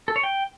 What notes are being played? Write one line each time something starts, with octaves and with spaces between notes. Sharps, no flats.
A4
C#5
G5